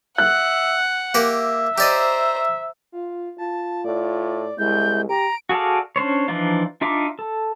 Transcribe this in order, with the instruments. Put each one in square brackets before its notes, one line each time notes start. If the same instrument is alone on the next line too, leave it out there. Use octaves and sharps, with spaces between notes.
[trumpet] E5 [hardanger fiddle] F#5 [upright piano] F#6
[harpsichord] A#3 G4 A#4 [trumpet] E5
[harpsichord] G4 D5 D#5 [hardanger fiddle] C5 A#5
[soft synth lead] F4
[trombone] F4 [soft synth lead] A5
[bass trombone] A2 [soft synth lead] D5
[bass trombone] C2 [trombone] G#3 [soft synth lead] E4 [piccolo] G6
[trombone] G4 [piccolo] A#5 [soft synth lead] D7
[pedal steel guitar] F#4 G#4 A4 D5 F5
C#4 D4 C5 C#5
E3 F3 D4 D#4 F4
D4 D#4 F4 E5 D6
A4